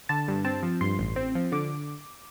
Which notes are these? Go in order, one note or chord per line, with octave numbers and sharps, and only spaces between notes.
D3 A5
G2
C4 A5
F3
G2 C6
A1
C4
F3
D3 D6